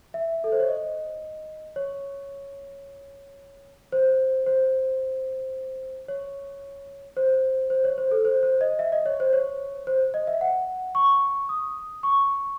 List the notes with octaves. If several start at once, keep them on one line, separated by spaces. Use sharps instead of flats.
E5
A4
C5
C#5
D#5
C#5
C5
C5
C#5
C5
C5
C#5
C5
A4
C5
C5
D#5
E5
D#5
C#5
C5
C#5
C5
D#5
E5
F#5
C#6
D#6
C#6